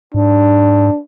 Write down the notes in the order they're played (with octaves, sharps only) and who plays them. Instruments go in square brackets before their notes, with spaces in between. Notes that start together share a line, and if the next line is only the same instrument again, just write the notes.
[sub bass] G#2 [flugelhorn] D4